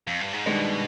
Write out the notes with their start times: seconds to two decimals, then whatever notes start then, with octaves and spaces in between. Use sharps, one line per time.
0.07 F2
0.20 G2
0.33 G#2
0.46 G2 B2 D#3 G#3 D4